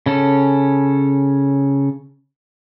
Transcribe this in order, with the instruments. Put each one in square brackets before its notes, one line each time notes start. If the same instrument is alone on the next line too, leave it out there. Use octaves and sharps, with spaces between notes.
[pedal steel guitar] C#3 C#4 A4